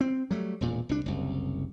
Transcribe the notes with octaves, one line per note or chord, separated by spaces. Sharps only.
C4
F#3 G3 A3
E1 A#2
C2 D4
F#1 C2